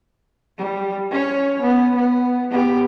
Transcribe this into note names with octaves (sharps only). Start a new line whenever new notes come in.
G3
C#4 C#5
B3
B3
B3 G4